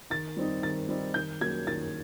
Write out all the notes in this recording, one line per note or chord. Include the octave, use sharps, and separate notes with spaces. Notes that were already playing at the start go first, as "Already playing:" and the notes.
D#3 A6
G3 C4 D#4
D#3 A6
G3 C4 D#4
D#3 G6
F#3 A#3 C#4 G#6
D#3 A6